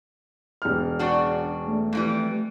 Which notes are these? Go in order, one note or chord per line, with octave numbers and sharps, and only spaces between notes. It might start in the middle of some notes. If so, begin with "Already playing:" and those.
E1 F6
C#3 D4 F#4 D5
A3
F2 E3 G3